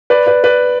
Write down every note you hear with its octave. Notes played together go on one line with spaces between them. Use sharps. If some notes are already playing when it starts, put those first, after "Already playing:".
B4 D5
B4 D5
B4 D5